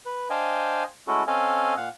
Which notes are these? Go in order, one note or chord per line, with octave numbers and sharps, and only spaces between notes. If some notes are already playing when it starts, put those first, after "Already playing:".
B4
D4 C5 D#5 F5 G5 G#5
G#3 A3 C#4 E4 F#4 A4
C4 C#4 A4 D#5 F5 G#5
A#2 F5 F#5